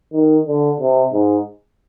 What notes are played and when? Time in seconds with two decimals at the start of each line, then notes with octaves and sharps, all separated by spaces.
0.13 D#3
0.47 D3
0.80 C3
1.13 G#2